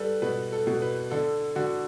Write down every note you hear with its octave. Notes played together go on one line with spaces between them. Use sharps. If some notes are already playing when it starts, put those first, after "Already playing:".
Already playing: G3 A4 B4
B2 B4
A4
B2
B4
D3 A4
D3 F#4